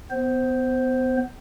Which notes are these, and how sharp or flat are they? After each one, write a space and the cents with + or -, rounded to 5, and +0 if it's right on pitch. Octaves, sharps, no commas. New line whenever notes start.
B3 +30 C5 +0